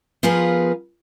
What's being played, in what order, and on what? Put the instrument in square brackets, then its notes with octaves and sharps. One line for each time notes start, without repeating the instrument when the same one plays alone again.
[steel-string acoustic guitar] F3 B3 F4 G#4 A#4 B4